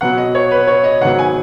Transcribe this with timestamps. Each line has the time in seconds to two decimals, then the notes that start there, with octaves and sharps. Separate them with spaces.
0.01 B2 F#3 B3 F#5
0.18 D#5
0.35 C#5
0.51 B4
0.67 C#5
0.84 D#5
1.01 G#2 D#3 F#3 B3 F#5
1.19 G#5